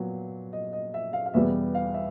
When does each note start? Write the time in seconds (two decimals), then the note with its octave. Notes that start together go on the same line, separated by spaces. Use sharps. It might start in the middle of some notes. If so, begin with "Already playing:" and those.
Already playing: A#2 F#3 B3
0.53 D#5
0.73 D#5
0.94 E5
1.13 F5
1.26 F5
1.34 E2 B2 G3 B3 E5
1.75 F5
1.94 E5